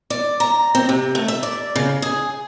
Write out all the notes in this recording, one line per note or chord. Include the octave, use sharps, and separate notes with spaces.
D5
A#5
C4
C3
A3
E5
D5
C#3
G#4